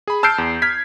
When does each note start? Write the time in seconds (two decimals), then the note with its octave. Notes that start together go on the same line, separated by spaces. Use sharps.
0.07 G#4 B5
0.23 A5 E6 F6 G6 C7 D7
0.38 E2
0.62 F6 G#6 B6